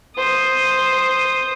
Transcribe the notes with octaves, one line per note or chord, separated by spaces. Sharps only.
C5 D#6